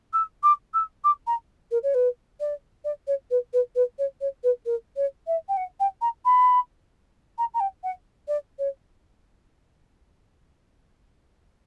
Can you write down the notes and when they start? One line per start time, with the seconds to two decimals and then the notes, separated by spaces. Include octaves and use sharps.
0.13 E6
0.43 D6
0.74 E6
1.04 D6
1.27 A#5
1.71 A#4
1.83 C#5
1.94 B4
2.40 D5
2.85 D5
3.07 C#5
3.31 B4
3.53 B4
3.75 B4
3.99 C#5
4.21 C#5
4.44 B4
4.66 A#4
4.96 C#5
5.27 E5
5.49 G5
5.57 F#5
5.80 G5
6.02 A#5
6.25 B5
7.38 A#5
7.54 A#5
7.60 G5
7.84 F#5
8.28 D5
8.59 C#5